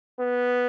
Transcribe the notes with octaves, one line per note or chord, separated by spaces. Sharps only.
B3